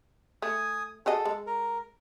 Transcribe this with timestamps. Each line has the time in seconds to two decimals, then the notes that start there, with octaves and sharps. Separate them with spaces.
0.42 A3 G#5 D#6
1.06 F#4 G#4 A4 D#5
1.25 G#3
1.47 A#4